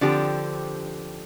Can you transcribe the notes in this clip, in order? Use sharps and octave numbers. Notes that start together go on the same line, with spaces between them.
D3 F3 C4 G4